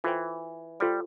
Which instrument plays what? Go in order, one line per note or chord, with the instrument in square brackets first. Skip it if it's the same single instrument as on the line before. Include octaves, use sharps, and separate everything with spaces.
[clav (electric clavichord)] E3 [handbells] F4 A4 C5 G5
[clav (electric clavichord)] G3 [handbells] F4 A4 C5 G5